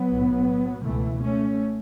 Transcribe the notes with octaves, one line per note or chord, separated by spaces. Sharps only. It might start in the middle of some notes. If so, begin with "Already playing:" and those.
Already playing: F#3 B3
B1 A2
C#2 B2 E3 A3
A3 C#4